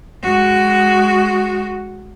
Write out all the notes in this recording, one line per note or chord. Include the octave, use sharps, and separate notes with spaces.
G#3 F#4